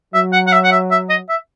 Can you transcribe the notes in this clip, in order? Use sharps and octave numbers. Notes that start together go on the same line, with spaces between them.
F#3 E5
F#5
F#5
E5
F#5
E5
E5
D#5
E5